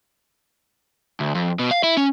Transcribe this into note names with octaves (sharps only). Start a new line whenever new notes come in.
D2
F2
B2
F5
E4
C#4